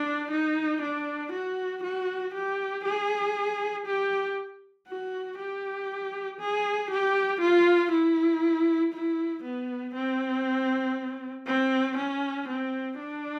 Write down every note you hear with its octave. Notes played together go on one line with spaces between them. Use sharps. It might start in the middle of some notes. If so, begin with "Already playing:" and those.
Already playing: D4
D#4
D4
F#4
F#4
G4
G#4
G4
F#4
G4
G#4
G4
F4
E4
E4
B3
C4
C4
C#4
C4
D4